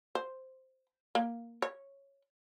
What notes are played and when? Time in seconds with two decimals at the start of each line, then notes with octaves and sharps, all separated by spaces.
0.15 C5
1.15 A#3
1.62 C#5